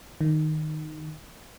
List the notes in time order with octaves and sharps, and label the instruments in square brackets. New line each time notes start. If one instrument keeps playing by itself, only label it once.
[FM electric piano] D#3